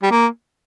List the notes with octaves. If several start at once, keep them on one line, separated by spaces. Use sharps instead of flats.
G3
A#3